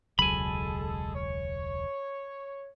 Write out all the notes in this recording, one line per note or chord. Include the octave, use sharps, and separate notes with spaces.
E1 C#2 F#3 G#3 G#4 A4 G#5 B5
C#5